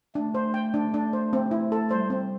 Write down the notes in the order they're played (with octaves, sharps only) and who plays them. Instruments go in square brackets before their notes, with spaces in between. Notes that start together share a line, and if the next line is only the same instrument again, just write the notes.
[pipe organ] A3 [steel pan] D4
[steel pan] C5
G5
D4
D4
C5
C4
E4
A4
[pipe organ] G3 [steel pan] C5
[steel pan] C4